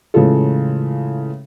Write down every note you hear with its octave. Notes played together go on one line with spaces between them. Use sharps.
A2 C#3 E3 G#3 F4 A4